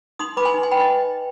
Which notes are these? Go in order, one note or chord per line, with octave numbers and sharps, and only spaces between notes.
D#4 C6 D#6
B4 B5 D6
G#5 C6
D#4
G#5 C6
B4 G5 B5
D#5